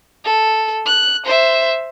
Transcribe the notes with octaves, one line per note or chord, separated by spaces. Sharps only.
A4
F#6
C5 E5